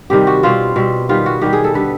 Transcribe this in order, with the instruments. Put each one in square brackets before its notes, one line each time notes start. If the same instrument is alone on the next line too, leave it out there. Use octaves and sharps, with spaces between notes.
[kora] C3 D#3 G3 G4
F#4
B2 G3 C4 F4
B2 G3 C4
D#3 G3 B3 F4
F#4
D#3 G3 B3 G4
G#4
A4
D3 G3 B3 B4